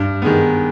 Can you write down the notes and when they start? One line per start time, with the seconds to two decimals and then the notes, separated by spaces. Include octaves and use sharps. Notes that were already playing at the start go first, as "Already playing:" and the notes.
Already playing: G2
0.22 D#3 G#3 B3